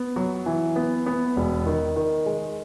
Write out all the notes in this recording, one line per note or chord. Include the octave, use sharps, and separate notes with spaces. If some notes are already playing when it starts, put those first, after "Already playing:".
Already playing: B3
F#3
E3
B3
B3
E1
D#3
D#3
G#3